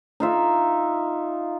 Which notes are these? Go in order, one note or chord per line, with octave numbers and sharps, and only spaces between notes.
D#4 F4 E5